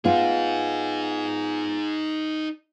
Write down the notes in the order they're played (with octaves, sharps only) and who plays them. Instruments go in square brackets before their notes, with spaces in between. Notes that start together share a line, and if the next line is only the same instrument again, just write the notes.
[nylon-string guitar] B3 F4 [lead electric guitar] D#4 G#4